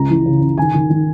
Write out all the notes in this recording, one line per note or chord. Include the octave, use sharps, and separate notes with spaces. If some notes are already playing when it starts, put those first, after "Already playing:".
Already playing: C#2 A#5
E3
C#3
C#3
D#3 G#5
D#3
D#3